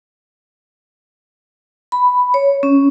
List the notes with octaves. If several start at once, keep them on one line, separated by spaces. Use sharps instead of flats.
B5
C#5
C#4